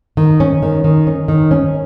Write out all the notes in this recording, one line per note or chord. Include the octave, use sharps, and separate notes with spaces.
D#3
C#4
D#3
D#3
C#4
D#3
C#4